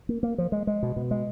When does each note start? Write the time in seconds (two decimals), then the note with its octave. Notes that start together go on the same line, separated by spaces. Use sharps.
0.09 A#3
0.23 A#3
0.38 F3
0.52 G#3
0.67 G#3
0.83 B2
0.96 B2
1.11 G#3